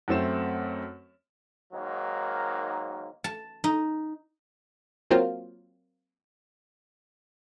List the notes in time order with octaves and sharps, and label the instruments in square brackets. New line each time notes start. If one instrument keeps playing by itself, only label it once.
[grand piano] F#2 A3 C4 E7
[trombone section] G#2 D#3 F#3 A#3
[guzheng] A5
D#4
[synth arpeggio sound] F#3 A#3 C4 F4 C5